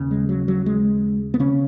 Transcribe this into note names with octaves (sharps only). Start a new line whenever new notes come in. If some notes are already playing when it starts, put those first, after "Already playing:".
Already playing: D#2 C#3
G#3
F#3
F#3
G#3
B3
C#3 C#4